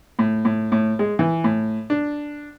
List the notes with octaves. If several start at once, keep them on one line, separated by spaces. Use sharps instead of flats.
A2
A2
A2
G#3
E3
A2
D4